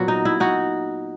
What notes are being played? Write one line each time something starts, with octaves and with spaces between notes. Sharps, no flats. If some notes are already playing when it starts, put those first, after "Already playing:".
Already playing: A#2 F#3 B3 F#4
D#4
E4
D#4 F#4